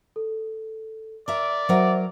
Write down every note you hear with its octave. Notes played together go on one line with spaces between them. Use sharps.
A4
A#4 D5 E5
F#3 A#4 C5 E5 F#5